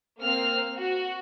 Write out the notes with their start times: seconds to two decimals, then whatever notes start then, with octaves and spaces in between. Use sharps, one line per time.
0.20 A#3 C4 F6
0.77 F#4